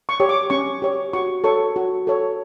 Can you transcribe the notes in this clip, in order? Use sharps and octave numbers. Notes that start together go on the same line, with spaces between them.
C#6
G4 C#5
D6
C#4 C#6
G4 C#5
F#4 C#6
A4 C#5 C#6
F#4
A4 C#5